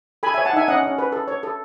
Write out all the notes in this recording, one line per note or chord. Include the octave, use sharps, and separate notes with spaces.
A4 G#5 B5
C#5 E5 G#5
F#5 A5
D#4 E5 G#5
C#4 D#5 F#5
C#4
B4
A4
C#5
A4